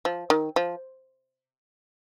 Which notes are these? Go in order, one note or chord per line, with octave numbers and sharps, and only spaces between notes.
F3
D#3
F3